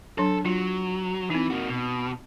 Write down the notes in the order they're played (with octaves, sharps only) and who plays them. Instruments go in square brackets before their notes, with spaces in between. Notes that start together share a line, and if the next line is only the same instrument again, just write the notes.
[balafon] F#3 D4 [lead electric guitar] A4
[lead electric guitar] F#3 [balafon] F4
[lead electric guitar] E3 [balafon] C4 D#4
[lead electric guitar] A#3 F#4
B2